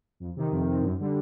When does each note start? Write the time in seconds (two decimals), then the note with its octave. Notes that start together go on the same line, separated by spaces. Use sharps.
0.20 F2
0.36 C3 D#3
0.52 F2
0.68 C3 D#3
0.83 F#2
1.00 D3 G3